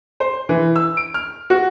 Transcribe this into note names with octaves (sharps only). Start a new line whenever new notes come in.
C5
E3
E6
D7
F6
F#4